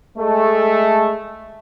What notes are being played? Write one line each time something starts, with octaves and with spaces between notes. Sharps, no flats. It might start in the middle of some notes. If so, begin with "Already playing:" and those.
G#3 A3